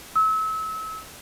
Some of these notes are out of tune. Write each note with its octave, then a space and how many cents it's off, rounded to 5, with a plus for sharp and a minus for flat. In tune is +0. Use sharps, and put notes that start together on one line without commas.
E6 -30